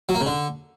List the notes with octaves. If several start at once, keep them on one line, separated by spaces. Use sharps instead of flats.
F#3
A#3
C#3
D3